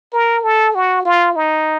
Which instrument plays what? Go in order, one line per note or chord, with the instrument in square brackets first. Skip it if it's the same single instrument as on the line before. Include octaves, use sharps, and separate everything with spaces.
[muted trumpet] A#4
A4
F#4
F4
D#4